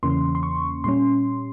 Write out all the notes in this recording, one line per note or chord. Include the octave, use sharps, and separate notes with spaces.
E2 C#3 E3 A#3 C#4 C6
C6
C#6
A#2 G3 C#4 C6